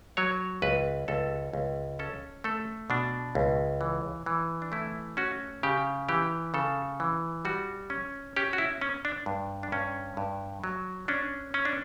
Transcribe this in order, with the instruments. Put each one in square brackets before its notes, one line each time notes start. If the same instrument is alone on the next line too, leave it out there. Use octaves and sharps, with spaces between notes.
[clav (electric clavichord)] F#3 C#5
C#2 B4
C#2 A4
C#2
C#4 A4
A3 A4
B2 D4
C#2
E3
E3
D4
A3 E4
C#4 F#4
C#3 G4
E3 G4
C#3 A4
E3
G3 F#4
C#4
C#4 G4
F#4
E4
C#4
D4
G2
D4
G2 C#4
G2
F#3
C#4 D4
C#4
D4